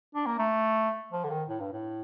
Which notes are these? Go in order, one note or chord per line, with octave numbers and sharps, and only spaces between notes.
D4
A#3
A3
F3
D3
D#3
A2
G2
A2